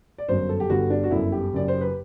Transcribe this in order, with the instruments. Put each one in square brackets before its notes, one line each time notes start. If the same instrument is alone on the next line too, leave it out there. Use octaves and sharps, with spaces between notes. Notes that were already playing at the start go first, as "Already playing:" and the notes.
[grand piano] D5
G1 F#2 F#3 C5
A4
G4
G1 G2 D3 G3 F#4
D4
F#4
G1 F#2 D3 E4
G4
F#1 F#2 F#3 D5
C5
B4